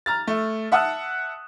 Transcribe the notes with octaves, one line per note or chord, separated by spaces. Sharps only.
A#5 F6 A6
A3
E5 F#5 A5 D#6 E6 F#6